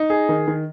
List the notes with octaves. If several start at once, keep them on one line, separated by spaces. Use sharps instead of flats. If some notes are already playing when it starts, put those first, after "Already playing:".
Already playing: D#4
G#4
D#3
D#3